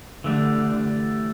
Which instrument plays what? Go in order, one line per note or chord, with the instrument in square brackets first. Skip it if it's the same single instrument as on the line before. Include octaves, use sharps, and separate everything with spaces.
[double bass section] D3 [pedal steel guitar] E3 A3 D4 G4